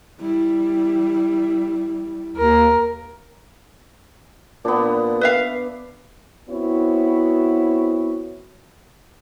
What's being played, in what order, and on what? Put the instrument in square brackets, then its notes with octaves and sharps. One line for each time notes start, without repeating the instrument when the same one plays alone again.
[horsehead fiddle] G3 E4
[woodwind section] D#2 [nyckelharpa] A#4
[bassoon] A#2 [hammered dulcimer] B3 D4
[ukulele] B4 E5 F5
[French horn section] B3 C4 E4 F#4 C#5